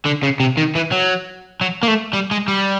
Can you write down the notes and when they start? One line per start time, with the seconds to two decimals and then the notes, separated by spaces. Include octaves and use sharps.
0.06 D3
0.23 C#3
0.40 C3
0.57 D#3
0.75 E3
0.92 F#3
1.61 F#3
1.83 A#3
1.88 A3
2.13 G3
2.31 G#3
2.48 G3